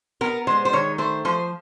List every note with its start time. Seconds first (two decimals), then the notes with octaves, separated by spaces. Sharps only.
0.21 B3 A#4
0.47 G#3 C5
0.65 C5
0.73 D#3 C#5
0.98 A3 C5
1.25 F3 C5